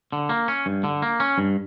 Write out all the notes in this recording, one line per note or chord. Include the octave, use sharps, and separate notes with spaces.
D3
A#3
C#4
G2
D3
A#3
C#4
G2